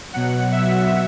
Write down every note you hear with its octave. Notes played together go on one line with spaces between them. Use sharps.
B2 F#3 F#5
E5